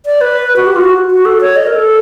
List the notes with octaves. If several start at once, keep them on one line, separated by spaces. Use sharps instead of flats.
D5
B4
F#4
G4
F4
F#4
F#4
A4
C#5
D#5
A#4
A4